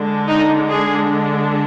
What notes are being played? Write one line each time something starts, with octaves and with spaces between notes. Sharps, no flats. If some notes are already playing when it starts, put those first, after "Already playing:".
Already playing: D3 G#3 D4
D#4
G#4